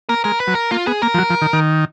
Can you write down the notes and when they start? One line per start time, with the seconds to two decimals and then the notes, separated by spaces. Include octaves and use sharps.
0.09 A#3 A#4
0.24 G#3 A#4
0.40 B4
0.47 F#3
0.55 A#4
0.71 A#3 F4
0.87 B3 G#4
1.02 A#3 A#4
1.14 F3
1.18 F#3
1.30 F3
1.42 D#3
1.53 D#3